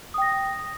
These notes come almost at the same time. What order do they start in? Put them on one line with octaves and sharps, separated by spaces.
D#6 G5 A#6